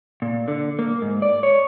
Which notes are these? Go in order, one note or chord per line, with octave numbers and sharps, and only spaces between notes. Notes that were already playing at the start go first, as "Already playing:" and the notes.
A#2
D3
A#3
G#2
D5
C#5